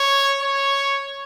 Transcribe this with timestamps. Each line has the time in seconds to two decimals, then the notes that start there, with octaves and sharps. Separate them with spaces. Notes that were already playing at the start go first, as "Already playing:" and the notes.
Already playing: C#5
0.42 C#5